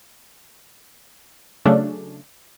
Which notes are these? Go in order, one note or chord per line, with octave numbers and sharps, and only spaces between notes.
C#3 F#3 A3 C#4 D4